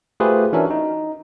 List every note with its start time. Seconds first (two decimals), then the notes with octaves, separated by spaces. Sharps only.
0.20 A3 F4 G4 G#4 B4 C5
0.53 E3 C#4 D4 F#4 A#4 E5
0.70 D#4